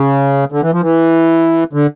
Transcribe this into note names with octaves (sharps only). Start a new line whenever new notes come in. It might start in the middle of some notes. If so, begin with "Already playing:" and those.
Already playing: C#3
D3
E3
F3
E3
D3